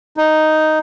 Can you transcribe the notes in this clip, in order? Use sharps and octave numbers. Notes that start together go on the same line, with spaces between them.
D#4